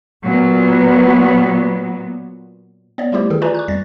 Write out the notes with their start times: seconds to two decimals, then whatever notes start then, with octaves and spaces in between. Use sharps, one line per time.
0.21 A#2 F#3 B3
2.98 B3 C#5 D5
3.12 G3 A3 E4 G4 C5
3.30 D#3 E3 G#4 A4
3.42 F4 B4 D5 G#5 A#5 C#6
3.55 C#6 F#6
3.68 F2 G3 A6 A#6